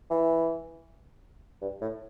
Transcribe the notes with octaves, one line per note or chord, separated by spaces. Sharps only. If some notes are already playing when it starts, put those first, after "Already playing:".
E3
G2
A2